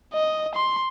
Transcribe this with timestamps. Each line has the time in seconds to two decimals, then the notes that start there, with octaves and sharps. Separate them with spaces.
0.14 D#5
0.55 C6